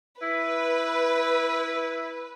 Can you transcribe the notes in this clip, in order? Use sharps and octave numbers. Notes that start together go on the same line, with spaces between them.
E4 B4